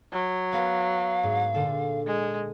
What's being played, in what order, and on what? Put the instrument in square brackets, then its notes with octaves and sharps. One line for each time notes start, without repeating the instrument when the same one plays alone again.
[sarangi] F#3
[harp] B3 A#4 B4 [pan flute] F5
[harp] G#2
A#2 D3 A4
[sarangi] G#3